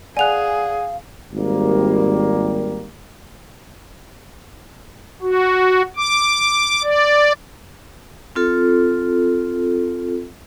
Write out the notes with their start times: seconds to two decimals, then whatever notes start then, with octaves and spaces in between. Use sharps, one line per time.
0.17 G#4 D5 F5 F#5 G#5 F#6 F7
1.32 G#1 G3 A#3
5.22 F#4
5.97 D6
6.84 D5
8.36 C4 F4 A4